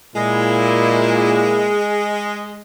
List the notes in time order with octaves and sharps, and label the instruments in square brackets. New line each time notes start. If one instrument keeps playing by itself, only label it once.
[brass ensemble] A#2 E4 [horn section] G#3